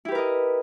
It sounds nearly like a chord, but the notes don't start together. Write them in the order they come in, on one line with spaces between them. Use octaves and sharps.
E4 G4 B4 A#4 D#5